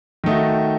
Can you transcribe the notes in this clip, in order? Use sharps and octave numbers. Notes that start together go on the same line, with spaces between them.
D#3 A3 D#4 F#4